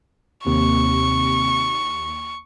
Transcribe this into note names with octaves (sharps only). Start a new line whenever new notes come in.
D#2 C3 C#6